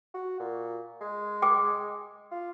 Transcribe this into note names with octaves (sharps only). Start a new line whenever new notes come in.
F#4
A#2
G#3
G5 D6
F4